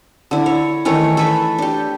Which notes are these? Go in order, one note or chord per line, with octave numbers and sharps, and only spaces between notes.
D3 E4
C#5
D#3 E3 A3 C#5
A4 B4 E5
D4 G4